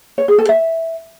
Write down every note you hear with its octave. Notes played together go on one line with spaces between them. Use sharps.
C#5
G#4
A4
E5